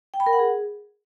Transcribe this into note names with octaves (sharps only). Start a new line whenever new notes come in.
G5
B5
A#4
F#5
G#4